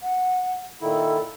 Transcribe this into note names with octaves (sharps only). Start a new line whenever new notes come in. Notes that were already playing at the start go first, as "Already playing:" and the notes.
F#5
A#2 D#3 E4 A4